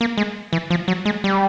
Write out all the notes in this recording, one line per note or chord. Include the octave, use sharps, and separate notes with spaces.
A#3
G#3
E3
F3
F#3
G#3
G3